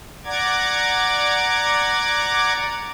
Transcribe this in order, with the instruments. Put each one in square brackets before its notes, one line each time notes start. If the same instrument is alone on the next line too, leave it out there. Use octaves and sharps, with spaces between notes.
[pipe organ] D5 F#5 A#5 D6 G#6